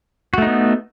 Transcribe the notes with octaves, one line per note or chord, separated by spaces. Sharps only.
A3 B3 D#4 F#4